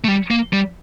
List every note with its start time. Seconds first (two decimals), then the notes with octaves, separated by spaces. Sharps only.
0.04 A3
0.08 G3
0.31 A#3
0.53 G3